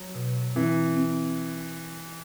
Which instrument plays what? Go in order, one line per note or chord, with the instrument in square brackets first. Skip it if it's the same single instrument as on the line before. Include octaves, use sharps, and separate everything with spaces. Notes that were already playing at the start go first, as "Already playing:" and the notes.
Already playing: [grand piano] F#3
[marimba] B2
[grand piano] E3 [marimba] C4
[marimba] C4